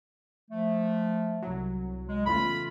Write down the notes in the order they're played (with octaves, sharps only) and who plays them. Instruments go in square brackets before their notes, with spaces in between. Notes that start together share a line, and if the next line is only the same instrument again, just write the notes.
[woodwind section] F3 A3
[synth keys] C2 F#3
[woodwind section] G#3
[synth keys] E2 C#3 A3 [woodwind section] F4 B5